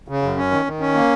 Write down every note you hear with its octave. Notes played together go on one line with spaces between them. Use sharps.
C#3
F#2
C#4
D#3
D#3
C#4
A#3